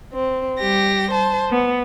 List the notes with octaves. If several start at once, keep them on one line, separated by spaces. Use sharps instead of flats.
C4
G3 G4 A#6
C5 A5
B3